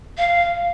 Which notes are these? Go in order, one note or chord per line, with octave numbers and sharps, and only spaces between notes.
F5